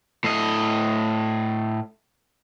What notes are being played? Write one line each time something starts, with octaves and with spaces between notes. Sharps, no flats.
A2 D#5